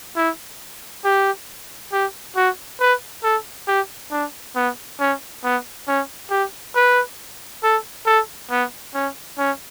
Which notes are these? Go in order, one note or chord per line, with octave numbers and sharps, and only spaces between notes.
E4
G4
G4
F#4
B4
A4
G4
D4
B3
C#4
B3
C#4
G4
B4
A4
A4
B3
C#4
C#4